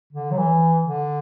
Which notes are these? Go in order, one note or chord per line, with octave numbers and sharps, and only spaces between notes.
D3
F#3
E3
D3